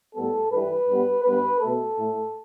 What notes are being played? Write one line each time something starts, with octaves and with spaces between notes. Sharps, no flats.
A2 G3 B3 A4
G2 E3 G3 B4
G2 G3 B3
G2 G3 B3 B4
B2 A3 A4
A2 A3